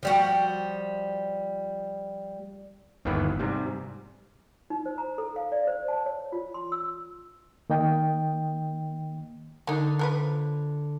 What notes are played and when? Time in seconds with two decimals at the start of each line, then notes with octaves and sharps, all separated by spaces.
0.03 F3 G3 F#4
3.05 G1 D#2 D#3 E3 B3 B4
3.39 G#2 C3 G3
4.70 D#4
4.86 C5
4.98 A#5
5.18 A4
5.36 F5
5.52 D5
5.67 C5
5.88 A5
6.06 C#5
6.32 F4
6.54 C6
6.72 E6
7.70 D#3 A#3 D#5 G5
9.67 D3 A#3 D#4
9.99 F3 A#4 B4